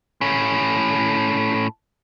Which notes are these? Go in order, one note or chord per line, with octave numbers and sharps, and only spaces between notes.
A2 C#4